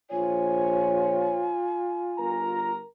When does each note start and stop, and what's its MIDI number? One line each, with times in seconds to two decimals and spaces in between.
0.11 1.54 34
0.11 2.70 65
0.11 1.54 72
0.11 1.54 73
0.11 2.41 80
2.18 2.78 31
2.18 2.78 70
2.18 2.78 82